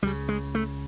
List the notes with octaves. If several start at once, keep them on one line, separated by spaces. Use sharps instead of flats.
C#2 C#3 G3
G#3
A3